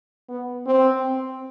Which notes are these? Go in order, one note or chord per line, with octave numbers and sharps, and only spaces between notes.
B3
C4